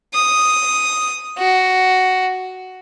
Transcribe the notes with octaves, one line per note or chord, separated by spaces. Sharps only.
D#6
F#4